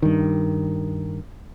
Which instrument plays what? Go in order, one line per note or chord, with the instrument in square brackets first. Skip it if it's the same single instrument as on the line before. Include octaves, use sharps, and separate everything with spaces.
[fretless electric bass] G2 D#3